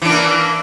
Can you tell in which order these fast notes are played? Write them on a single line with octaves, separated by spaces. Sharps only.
E3 D4 A#3